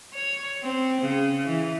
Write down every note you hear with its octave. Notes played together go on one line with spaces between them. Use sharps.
C#5
C4
C#3
E3